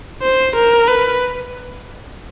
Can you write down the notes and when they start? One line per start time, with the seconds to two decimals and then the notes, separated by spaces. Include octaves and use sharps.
0.22 C5
0.55 A#4
0.88 B4